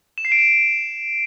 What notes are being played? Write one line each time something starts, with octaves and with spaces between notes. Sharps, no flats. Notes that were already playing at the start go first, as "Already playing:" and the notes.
E7
C7
D7
E7